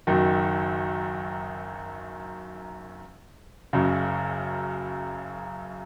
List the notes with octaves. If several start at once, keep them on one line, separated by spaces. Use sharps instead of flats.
F#1 F#2 D#3
F#1 F#2 C#3